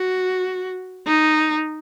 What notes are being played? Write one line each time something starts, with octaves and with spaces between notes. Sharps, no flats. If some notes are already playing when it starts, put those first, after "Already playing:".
Already playing: F#4
D#4